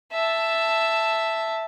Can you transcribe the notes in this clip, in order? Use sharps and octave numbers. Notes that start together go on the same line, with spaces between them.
E5 A5